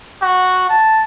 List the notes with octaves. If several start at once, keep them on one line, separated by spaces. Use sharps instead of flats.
F#4
A5